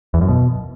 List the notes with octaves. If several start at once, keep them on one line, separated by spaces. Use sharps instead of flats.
E2
F#2
B2